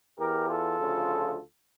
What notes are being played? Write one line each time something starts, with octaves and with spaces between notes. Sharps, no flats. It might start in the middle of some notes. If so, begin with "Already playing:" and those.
E2 E3 G4 A#4
F4 A4
D2 C#3 F3